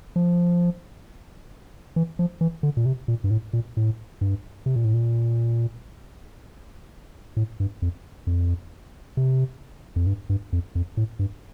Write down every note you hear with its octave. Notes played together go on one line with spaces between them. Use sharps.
F3
E3
F3
E3
D3
A#2
C3
A#2
G2
A2
A#2
A2
G2
C3
A#2
A2
A#2
A2
G2
F2
F2
C3
F2
G2
G2
F2
F2
A2
G2